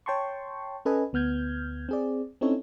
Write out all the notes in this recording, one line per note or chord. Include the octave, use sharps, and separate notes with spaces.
C#5 G5 A5 C6 C#6
C#4 A4 B4 D#5 G#5
D2 B3 F6 G6 G#6
C4 G#4 D5
C4 C#4 D#4 E4 A4 C#5